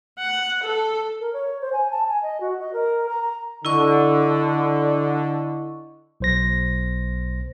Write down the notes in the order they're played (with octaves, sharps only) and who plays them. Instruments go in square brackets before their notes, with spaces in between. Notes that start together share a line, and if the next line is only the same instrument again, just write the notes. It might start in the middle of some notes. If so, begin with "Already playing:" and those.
[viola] F#5
A4
[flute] A#4
C#5
C5
G#5
A5
G#5
D#5
F#4
D#5
A#4
A#5
A#5
[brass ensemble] D3 [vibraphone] E4 D#5 C#6
[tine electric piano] B1 C5 A#6